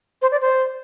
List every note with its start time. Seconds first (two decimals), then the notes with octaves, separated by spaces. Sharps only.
0.22 C5
0.32 D5
0.41 C5